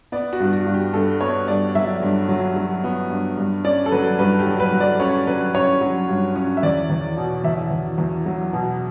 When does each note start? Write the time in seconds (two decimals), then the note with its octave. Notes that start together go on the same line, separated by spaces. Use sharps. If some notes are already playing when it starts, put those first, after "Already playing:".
0.12 B3 D5
0.33 F#4
0.40 G2
0.53 F#4
0.67 G2
0.74 G4
0.93 G2 A4
1.21 B3 C#5
1.48 G2 D5
1.75 F#3 E5
2.02 G2
2.29 F#3
2.56 F#3
2.84 B3
3.10 G2
3.37 G2
3.64 C#4 D5
3.86 A4
3.92 F#3 B4
4.19 G2 B4
4.39 G4
4.46 F#3
4.60 B4
4.73 F#3
4.80 D5
5.00 C#4 C#5
5.27 F#3 B4
5.54 C#4 C#5
5.81 F#3
6.09 G2
6.36 C#4
6.57 E5
6.63 E2 D5
6.90 E2
7.17 B2
7.44 E2 E5
7.71 E2
7.98 E2
8.26 F#3
8.53 B2